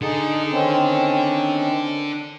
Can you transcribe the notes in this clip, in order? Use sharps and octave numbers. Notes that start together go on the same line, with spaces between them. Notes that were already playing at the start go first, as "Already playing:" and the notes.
D3 D#4 G#4 A4
D#3 C4 C#4